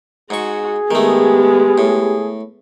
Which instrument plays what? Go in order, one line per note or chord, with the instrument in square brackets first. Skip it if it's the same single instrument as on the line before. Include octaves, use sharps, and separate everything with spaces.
[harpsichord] G#2 C#6 [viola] F#4 [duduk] G#4
[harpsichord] D#3 A3 [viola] G#3 B3 [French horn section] G4
[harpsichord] A2